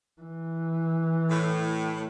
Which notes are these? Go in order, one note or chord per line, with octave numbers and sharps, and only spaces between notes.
E3
A2